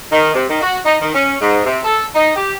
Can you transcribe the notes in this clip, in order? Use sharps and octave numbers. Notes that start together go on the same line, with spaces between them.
D#3
C3
D#3
F#4
D#4
D#3
C#4
G#2
C3
A4
D#4
G4